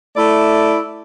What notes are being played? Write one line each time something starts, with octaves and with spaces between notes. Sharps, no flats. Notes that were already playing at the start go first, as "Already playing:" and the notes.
A3 E4 D5